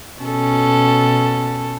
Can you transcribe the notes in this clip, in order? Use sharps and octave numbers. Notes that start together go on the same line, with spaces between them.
B2 C#4 A4